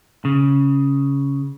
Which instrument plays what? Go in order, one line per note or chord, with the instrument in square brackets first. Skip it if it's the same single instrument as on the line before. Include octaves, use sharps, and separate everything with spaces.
[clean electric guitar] C#3